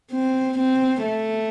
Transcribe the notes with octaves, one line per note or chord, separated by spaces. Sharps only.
C4
C4
A3